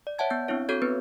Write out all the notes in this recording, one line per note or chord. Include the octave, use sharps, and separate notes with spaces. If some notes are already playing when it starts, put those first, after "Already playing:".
D5
C#5 E5 F#5 A5 G#6
B3 G6
B3 C4 D4 E4 C#5
C4 F#4 A4 C#5 G6 G#6
B3 C4 B4